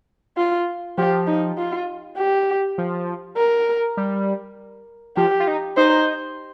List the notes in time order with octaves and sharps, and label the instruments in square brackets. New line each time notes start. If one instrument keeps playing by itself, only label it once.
[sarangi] F4
[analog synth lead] F3 [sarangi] G4
[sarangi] D#4
F4
G4
[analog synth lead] F3
[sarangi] A#4
[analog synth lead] G3
[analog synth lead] F3 [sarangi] G4
[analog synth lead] F4
D#4
[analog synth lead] D#4 [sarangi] C5